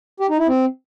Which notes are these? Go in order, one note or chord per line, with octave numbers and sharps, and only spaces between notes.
G4
D#4
E4
C4